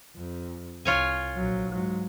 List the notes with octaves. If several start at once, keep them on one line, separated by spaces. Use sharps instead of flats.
F2
C2 F4 C#5 G#5
A#1 F#3
G#2 F#3